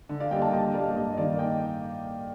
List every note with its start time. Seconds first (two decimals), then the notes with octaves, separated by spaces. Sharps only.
0.09 D3
0.20 D5 F5
0.31 G3 A#3 D#5 G5
0.42 F5 A5
0.53 D3 D#5 G5
0.70 D#5
0.74 G3 A#3 D5 F5
0.96 G2 D#5
1.12 D#5
1.17 D#3 A#3 D5 F5
1.39 D#5 G5